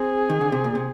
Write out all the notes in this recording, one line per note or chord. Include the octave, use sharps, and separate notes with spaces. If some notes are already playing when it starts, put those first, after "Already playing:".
Already playing: C4 G#4
D#3
D3
C3
A#2
C3